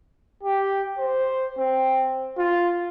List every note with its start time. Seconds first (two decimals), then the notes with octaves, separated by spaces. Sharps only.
0.43 G4
0.99 C5
1.58 C4
2.38 F4